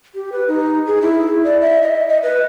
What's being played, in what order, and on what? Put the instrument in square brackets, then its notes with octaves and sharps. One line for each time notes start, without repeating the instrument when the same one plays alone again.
[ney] G4
B4
D#4
G#4
E4
D5
E5
D#5
D#5
B4